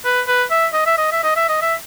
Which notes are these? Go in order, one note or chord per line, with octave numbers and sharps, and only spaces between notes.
B4
B4
E5
D#5
E5
D#5
E5
D#5
E5
D#5
E5